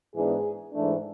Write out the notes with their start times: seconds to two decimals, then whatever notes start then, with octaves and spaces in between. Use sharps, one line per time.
0.16 G#2 E3 B3 D4 G#4
0.73 G#2 E3 A3 D4